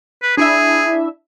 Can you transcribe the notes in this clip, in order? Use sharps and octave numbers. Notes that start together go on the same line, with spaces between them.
B4
D4 E4 G#4 E5